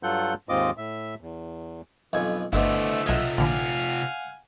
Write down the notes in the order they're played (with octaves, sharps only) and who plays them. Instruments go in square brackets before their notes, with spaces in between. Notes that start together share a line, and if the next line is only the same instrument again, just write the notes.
[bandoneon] G2 F#3 F4 A4 F#5 G6
D#2 G#2 C4 F4 D#5 D6
A2 E5
E2
[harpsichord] B1 F2 G#5 [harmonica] D3 B3
[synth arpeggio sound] G1 [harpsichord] D2 B2 D6 [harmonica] A3 E6 [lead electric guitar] E4 C5
[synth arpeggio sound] B1 G#6 [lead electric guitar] C3 F4 [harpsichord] D#5 E5 F#5
[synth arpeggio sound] A#1 D3 [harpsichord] D5 [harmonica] F5 F#5 G#5